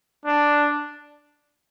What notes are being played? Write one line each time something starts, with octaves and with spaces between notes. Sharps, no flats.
D4